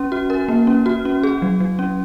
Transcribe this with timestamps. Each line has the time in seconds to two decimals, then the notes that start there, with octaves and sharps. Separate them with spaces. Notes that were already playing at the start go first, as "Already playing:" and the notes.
Already playing: C#4
0.12 F#4
0.30 A#4
0.48 A#3
0.67 C#4
0.86 F#4
1.05 C#4
1.23 G#4
1.42 F#3
1.60 F#3
1.79 C#4